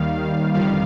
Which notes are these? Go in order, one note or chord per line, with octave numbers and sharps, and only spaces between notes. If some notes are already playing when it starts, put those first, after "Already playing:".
Already playing: D#2 D#3 G3 F5
G1 F2 D#3 G3 F5